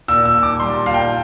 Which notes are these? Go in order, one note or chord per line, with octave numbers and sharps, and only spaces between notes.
A#2 E6
E6
A#2
D6
G3 C6
A#2 F5
G5